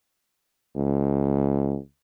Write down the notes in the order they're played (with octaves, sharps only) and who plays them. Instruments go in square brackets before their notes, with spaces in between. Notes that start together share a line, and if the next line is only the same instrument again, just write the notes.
[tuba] C#2